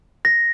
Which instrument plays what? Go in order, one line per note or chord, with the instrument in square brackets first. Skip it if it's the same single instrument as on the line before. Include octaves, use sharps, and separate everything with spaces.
[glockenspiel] A#6